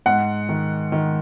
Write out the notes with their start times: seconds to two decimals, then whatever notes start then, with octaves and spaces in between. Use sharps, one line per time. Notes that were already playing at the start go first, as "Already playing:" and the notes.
0.06 G#2 F#5
0.49 D#3
0.92 D#3